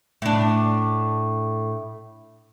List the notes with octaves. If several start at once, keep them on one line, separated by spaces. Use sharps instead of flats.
A2 D4